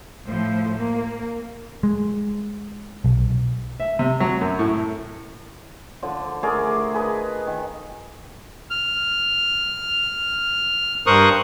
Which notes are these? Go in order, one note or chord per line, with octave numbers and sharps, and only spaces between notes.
A2 F3 C5
A#3
G#3
B1
E5
C3
F#3
F#2
A2
D3 F3
A3 G#4 A#4 D5
G#4 B4 D#5
D#3
F6
G2 A#4 C5 C#6 D#6 F#6